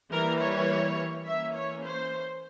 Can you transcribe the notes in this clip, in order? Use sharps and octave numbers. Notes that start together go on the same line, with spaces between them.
E3 G3 A#3 A#4
C#5
E3 A#3 C#4 E5
C#5
C5